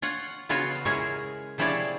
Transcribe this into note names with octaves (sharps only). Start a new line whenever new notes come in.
F4 C#5 F#5
C#3 B3 F4 F#4 C#5
G#3 C#4 E4 G#4 A#4 C#5
C3 F3 E4 G#4 C#5 D5